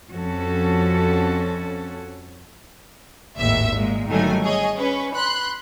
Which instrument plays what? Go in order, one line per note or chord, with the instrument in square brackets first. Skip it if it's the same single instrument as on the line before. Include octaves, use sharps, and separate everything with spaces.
[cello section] F2 F3 C#4 F#4 A4
[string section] G#1 D#2 A2 E5
A#2 G#3
G1 D#3 F#3 G3 A3 G#5
G#4 C#5 D#5
C#4 B4
B5 C6 F#6